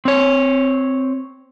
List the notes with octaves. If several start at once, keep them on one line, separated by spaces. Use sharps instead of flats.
C4 C#5